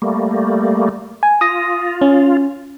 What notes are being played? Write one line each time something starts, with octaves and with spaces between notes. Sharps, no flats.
G3 A3 A#3
G#5
F4 D#6 A#6
C#4